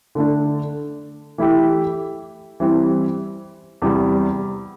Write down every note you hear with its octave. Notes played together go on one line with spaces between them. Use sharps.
D3 A3 D4
E3 A3 E4 G4
E3 G3 C4 E4
E2 C3 G3